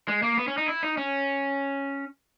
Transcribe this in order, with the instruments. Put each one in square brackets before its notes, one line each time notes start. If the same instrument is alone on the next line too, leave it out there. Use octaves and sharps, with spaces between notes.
[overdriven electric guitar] G#3
A#3
B3
C#4
D#4
E4
D#4
C#4